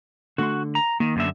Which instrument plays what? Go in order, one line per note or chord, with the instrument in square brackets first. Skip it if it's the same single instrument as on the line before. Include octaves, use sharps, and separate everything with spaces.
[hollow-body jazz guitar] D3 A3 C6 [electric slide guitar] F#4
[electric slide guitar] A#5
[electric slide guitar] D#3 [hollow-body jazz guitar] A#3
[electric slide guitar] F#2 D3 E5